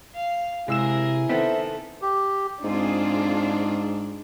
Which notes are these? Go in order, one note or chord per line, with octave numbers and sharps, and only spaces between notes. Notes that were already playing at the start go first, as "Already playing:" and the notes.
F5
C3 G#3 E4 G#4 A#4 E6 E7
D#3 B3 C4 A4 E5
G4
G#2 C4 D4 F4 G#4